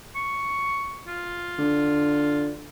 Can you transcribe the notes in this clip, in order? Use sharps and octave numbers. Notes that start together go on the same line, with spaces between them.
C#6
F4
D3